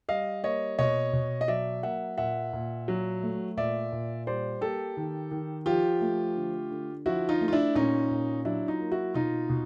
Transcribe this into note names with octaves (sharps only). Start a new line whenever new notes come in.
G3 D#5 F5
A#3 C#5 D#5
B2 C#5 D#5
B2
D#5
F#3 D5 E5
A#3 E5 F#5
A#2 E5 F#5
A#2
F#3
A3
A#2 D5 E5
A#2
G3 C5 D5
A#3 G4 A4
D#3
D#3
F3 F4 G4
A3
D3
D3
F3 E4 F#4
D#4 F4
A3
F4
D4 E4
A#2 C#4 D#4
A#2
F#3 D4 E4
D#4 F4
A#3
E4 F#4
B2 D#4 F4
B2